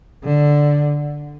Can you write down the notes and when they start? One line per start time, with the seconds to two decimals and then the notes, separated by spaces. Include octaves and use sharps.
0.24 D3